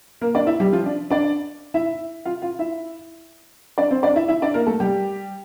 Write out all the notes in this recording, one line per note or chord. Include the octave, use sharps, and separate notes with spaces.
A#3 A#4
D4 D5
E4 E5
G3 G4
F3 F4
D4
D4 D5
E4 E5
F4 F5
F4 F5
E4 E5
D4 D5
C4 C5
D4 D5
E4 E5
E4 E5
D4 D5
A#3 A#4
A3 A4
G3 G4